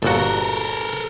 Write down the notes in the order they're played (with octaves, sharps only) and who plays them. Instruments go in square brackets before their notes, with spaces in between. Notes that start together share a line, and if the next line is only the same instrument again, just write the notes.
[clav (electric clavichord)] G1 A#2 F#4 [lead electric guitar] A4 A#4